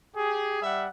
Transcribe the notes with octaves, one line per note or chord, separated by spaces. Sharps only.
G4 G#4
G3 E5 F#5